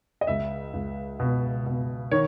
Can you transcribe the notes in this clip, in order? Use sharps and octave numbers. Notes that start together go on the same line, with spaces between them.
D#5
C#2 E5
C#2
B2
B2
D#3 C#5